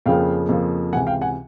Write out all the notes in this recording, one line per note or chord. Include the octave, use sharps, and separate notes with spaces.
F2 C#3 F3 A#3 F5 G5
F2 C#3 F3 A#3
C#2 C3 E3 F#5 G#5
F5 G5
F#5 G#5